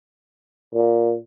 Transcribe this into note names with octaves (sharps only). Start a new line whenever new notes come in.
A#2